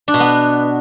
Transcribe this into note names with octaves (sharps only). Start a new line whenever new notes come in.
D4
B2
B3